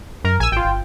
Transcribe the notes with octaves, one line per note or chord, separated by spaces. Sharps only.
F#2 A#4
A#1 G#5 E6
G#1 F4 G5
G1